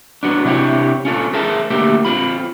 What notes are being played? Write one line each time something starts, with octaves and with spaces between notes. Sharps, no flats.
F#3 B3 D4
C3 D4 E4 G4 C#5
C#4 F4 A4
G#4 A#4 C5 E5 A5
D2 A#3 G4 E5
C4 F4 B5